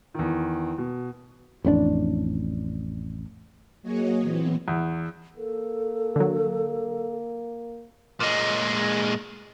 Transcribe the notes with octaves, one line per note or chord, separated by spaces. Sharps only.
E2 D#3
B2
A1 F2 B3 D4
F#3 A#3 F#4 G#4 C#5 D#5
A#2 E3 B3 C4
E2
A#3 A4
D3 F#3
A#2 G#3